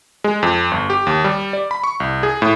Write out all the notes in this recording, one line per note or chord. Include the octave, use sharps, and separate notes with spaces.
G#3
F2
G1
G4
D#2
G3
D5
B5
C#6
C2
G#4
A2